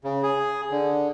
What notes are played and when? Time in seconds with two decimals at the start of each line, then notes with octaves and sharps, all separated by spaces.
0.04 C#3
0.23 G#4
0.71 D3